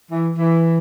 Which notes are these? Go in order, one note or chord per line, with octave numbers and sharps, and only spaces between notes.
E3
E3